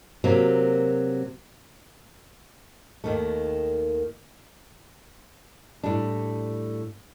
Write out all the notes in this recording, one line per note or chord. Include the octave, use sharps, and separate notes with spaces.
C3 F#3 A#3
D#2 D#3 A3
A2 G3 D4